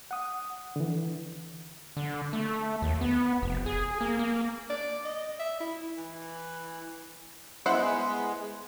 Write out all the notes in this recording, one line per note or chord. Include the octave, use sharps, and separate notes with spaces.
F#5 D#6
D3 E3
D3
A3
D#2
B3
F1
G#4
A#3
A#3
D5
D#5
E5
E4
E3
G#3 B3 E4 C5 F#5